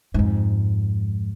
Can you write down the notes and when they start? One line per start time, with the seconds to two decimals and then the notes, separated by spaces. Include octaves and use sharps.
0.14 F2 G#2